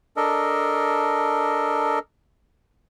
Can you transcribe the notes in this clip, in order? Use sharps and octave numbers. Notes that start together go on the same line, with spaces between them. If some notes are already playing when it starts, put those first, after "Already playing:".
D4 A4 A#4 D#5